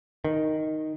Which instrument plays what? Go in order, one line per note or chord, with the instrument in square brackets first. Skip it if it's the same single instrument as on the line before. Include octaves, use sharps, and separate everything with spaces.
[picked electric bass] D#3